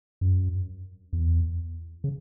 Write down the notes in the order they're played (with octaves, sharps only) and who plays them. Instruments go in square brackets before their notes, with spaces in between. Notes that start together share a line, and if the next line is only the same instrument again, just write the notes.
[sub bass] F#2
E2
C#3